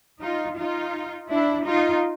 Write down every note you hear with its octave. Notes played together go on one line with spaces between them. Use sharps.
D#4 F4
D#4 F4
D4 E4
D#4 F4